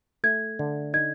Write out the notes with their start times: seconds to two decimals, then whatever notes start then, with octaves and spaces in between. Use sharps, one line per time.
0.24 A3 G#6
0.59 D3
0.94 D#4 G#6